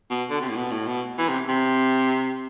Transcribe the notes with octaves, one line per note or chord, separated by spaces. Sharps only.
B2
D3
C3
A2
B2
A2
B2
E3
C3
C3